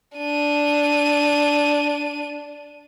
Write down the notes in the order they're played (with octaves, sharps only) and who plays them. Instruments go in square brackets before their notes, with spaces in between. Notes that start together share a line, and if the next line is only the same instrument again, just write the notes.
[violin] D4 D#7